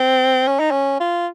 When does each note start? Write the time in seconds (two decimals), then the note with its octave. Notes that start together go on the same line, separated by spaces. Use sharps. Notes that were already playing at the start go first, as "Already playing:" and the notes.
Already playing: C4
0.47 C#4
0.59 D#4
0.71 C#4
1.00 F4